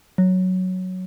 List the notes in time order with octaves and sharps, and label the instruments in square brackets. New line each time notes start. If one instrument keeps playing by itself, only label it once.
[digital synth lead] F#3